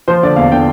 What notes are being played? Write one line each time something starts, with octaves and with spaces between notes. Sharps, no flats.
F3 C5
D3 D5
E2 F5
D3 G5